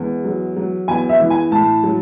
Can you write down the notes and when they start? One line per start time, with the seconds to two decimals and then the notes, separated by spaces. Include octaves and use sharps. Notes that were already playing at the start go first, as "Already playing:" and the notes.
Already playing: E2 G#3
0.25 F#3
0.57 F#3
0.88 E2 G#5
1.09 E5
1.20 E3
1.30 G#5
1.51 A2 A5
1.83 F#3